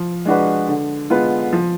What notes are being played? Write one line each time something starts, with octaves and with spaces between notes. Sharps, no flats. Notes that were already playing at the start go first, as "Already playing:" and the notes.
Already playing: F3
G#3 D4 F#4 B4
D3
G#3 B3 F4 B4
F3